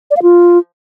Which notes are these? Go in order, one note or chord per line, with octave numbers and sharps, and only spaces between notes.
D5
F5
F4